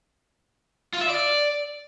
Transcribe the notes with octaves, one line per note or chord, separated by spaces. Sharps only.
F4
E5
D5